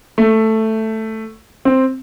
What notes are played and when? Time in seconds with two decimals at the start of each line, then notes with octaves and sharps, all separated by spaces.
0.18 A3
1.65 C4